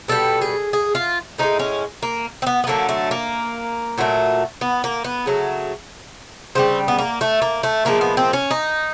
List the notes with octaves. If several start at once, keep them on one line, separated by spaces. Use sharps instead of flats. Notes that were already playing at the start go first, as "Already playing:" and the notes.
B2 G3 A4
G#4
G#4
F4
A2 F3 G#3 D#4
C#4
A#3
C4
B3
B3
D3 F#3 A3 A#3
A3
A#3
A#2 F#3 A3
B3
A#3
B3
C#3 F#3 A3
C#3 E3 G3 C4
B3
A#3
A3
A#3
A3
A#2 F3 G#3 A#3
B3
C4
C#4
D#4